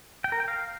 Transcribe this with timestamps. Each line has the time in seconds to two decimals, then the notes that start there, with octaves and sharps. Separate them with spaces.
0.24 G5
0.32 A#4
0.40 G5
0.48 F5